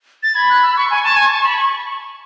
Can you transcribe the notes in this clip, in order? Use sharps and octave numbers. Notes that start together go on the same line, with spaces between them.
A6
B5 G#6
F#6
E6
C#6
G#5 C#6
A5
G#5
A5
B5